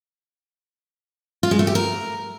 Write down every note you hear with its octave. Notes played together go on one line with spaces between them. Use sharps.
F4
G#3
A3
G4
A#4